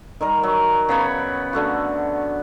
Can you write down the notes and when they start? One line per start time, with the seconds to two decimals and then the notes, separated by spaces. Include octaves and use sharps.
0.21 D#3 G3 A#4
0.43 F#3 C#6
0.89 C#3 B3 C#5 B5
1.53 D3 A3 F#4